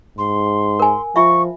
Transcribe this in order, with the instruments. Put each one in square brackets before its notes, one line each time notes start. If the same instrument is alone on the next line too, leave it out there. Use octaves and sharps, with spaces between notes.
[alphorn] G#2 [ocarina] C6
[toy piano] A#4 G#5
[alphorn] F3 [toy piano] F4 E5 [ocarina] C#6